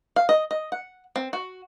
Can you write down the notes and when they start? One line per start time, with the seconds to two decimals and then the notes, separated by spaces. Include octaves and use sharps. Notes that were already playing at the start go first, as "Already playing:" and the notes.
0.16 F5
0.29 D#5
0.51 D#5
0.72 F#5
1.16 C4
1.33 F#4